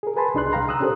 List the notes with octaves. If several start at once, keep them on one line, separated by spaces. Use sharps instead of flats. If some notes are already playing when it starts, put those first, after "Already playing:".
G#4 A#4
G#4 B4 G#5 A5 B5 C6
C2 D4 D#4 G#4 C6 F#6
C2 F5 G5 A#5 C6
A#5 D#6 E6 F#6
C#4 D4 G4 A4 A#4 C5